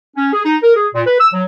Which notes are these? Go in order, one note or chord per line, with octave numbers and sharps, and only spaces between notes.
C#4
G#4
D#4
A#4
G#4
A#2
B4
E6
F#3